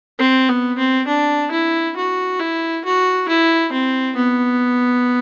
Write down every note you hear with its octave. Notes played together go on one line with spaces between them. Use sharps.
C4
B3
C4
D4
E4
F#4
E4
F#4
E4
C4
B3